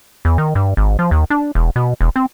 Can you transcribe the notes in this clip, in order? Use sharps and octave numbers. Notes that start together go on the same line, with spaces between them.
E2
D#3
G2
G#1
F3
D#2
D4
E1
B2
E1
C4